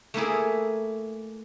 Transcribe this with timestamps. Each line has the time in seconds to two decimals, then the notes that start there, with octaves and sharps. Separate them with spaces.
0.14 A3 A#3 E4 G#4